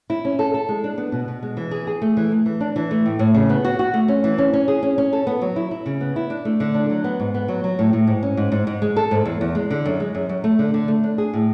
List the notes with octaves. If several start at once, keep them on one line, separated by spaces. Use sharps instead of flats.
E4
C#4
A4
A4
G#3
D4
B3
B2
B2
G#3
E3
G#4
G#4
A3
E3
A3
E3
D4
E3
A3
A2
A2
C#3
B3
F#4
F#4
A3
C#4
E3
C#4
C#4
G#4
C#4
C#4
A4
B3
F#3
E4
E4
C#3
B3
E4
D4
A3
D3
D4
F#3
B3
G#2
B3
F#3
F#3
A2
A2
G#2
C#4
G#2
G#2
G#2
G#3
A4
G#2
E2
E2
G#3
D3
F#2
G#3
F#2
F#2
A3
D3
D3
A3
D4
G#4
A2